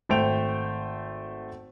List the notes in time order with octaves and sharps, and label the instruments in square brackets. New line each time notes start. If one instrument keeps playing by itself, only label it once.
[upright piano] G#1 A3 C5 G5 D7 F7